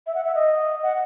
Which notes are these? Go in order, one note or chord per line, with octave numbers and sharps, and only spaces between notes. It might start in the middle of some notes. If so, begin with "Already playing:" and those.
E5
F#5
E5
D#5
F#5